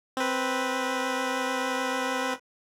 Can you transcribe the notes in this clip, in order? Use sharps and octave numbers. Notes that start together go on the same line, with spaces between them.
C4 B4